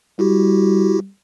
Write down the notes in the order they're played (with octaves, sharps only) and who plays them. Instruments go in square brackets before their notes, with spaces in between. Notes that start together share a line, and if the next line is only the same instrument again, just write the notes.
[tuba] G3 [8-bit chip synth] E4 F#4 G4